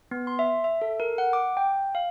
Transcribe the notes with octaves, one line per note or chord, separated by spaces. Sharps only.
B3
C6
E5
E5
A4
A#4
F#5
D6
G5
F5